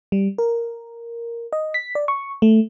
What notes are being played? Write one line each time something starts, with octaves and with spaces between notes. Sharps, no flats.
G3
A#4
D#5
B6
D5
C#6
A3